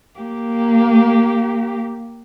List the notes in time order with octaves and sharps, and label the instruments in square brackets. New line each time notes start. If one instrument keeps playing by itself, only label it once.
[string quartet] A#3 G4